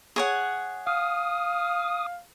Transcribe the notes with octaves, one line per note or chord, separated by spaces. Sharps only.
G#4 C#5 F#5
F5 D#6